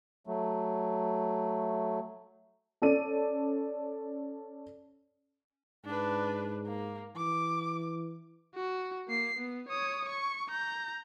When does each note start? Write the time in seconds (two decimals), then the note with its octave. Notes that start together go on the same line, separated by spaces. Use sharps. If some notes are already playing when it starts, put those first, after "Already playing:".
0.27 F#3 A3
2.82 C#4 A4 D5 D#7
5.85 G#2 D4 B4
6.67 A#3
7.16 E3 D6
8.55 F#4
9.08 A#3 C7
9.38 B3
9.69 C#5 D#6
10.09 C#6
10.50 A#5 G6